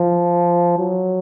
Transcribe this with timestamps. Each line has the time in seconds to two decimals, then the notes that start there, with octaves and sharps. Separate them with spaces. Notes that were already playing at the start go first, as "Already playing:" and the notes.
Already playing: F3
0.78 F#3